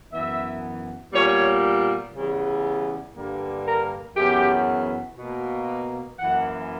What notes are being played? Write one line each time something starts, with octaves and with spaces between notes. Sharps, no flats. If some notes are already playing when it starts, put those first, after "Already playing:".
F#2 E3 B3 E5
A#2 G3 B3 C#5
C#3 E3 G3 B3
G2 D3 G3 A#3
A#4
F#2 C#3 E3 B3 G4
B2 A#3
F#2 E3 A#3 F#5